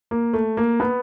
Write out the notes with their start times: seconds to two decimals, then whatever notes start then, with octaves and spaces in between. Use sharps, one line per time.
0.11 A#3
0.33 A3
0.57 A#3
0.80 B3